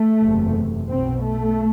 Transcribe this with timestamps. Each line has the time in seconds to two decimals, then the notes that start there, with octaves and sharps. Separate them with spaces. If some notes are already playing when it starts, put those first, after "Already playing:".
Already playing: A3
0.20 F#1 E2 C3
0.88 B1 B2 C4
1.23 A3